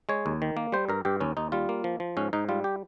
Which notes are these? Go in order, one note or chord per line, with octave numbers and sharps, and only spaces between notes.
G#3 C#5
D#2
D#3
A#3
G3 C5
G2 A#4
G2 G4
D#2 C#4
D#2 D#4
G3 F4
A#3
F3
F3
G#2 C#4
G#2 D#4
G3 F4
G4